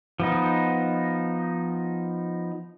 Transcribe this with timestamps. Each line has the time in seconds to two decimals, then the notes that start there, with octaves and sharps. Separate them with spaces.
0.20 F3 B3 D#4